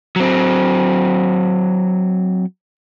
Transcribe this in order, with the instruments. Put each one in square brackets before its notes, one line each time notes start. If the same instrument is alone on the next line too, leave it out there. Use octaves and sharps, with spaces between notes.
[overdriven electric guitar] F#3 C4